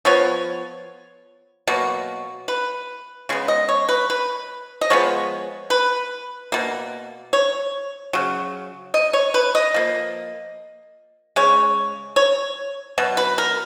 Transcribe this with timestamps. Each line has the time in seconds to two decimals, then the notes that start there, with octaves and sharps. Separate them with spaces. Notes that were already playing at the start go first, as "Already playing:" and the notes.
0.05 F3 B3 C#5
1.67 B2 F#3 A#3
2.48 B4
3.29 C#3 G#3 B3
3.48 D#5
3.69 C#5
3.89 B4
4.10 B4
4.81 D#5
4.90 F3 G#3 B3 C#5
5.70 B4
6.52 B2 A#3
7.33 C#5
8.13 C#3 F#3
8.94 D#5
9.13 C#5
9.34 B4
9.55 D#5
9.74 F3 A#3
11.36 C#3 G#3 C#5
12.16 C#5
12.98 B2 F#3
13.17 B4
13.38 A#4